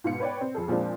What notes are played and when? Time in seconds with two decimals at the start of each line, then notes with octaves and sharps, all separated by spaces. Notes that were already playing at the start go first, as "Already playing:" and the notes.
0.04 G#2 B2 F5 C#7
0.20 B4 C#5 D5 G5
0.41 C4
0.55 F2 G#4 A4
0.68 A#2 F3 G#3 C4 D4